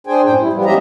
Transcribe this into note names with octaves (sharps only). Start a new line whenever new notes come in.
D4 G#4 C5 G5 G#5
F#2 A2 C5 G5
G3 E4
F3 G3 B3
G#2 C#4 G4 D#5 E5 A#5